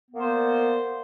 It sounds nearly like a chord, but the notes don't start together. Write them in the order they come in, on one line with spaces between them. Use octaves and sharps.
B3 A#3 C5 D5